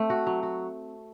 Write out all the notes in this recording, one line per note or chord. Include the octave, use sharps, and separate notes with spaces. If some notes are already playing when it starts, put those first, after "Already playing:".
Already playing: A3 C4
F#4
F#3
F#4